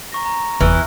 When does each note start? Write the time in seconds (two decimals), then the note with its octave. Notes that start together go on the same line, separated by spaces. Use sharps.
0.12 A#5 C#6 A#6
0.25 A#5
0.61 F#1 E2 E3 F6